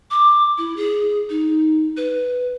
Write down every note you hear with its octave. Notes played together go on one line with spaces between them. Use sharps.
D6
E4
G#4
D#4
B4